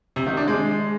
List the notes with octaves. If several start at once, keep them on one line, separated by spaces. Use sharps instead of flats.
C3
D#3
D4
G#3